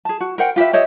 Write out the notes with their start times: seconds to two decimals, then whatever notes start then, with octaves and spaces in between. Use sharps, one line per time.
0.05 G#4 A5
0.20 F#4
0.38 A#4 C5 F#5 G5
0.56 F4 G4 B4 E5
0.73 G4 C#5 D#5 E5